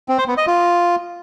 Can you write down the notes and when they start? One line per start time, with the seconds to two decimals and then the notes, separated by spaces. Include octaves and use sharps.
0.09 C4
0.18 C5
0.28 B3
0.37 D#5
0.47 F4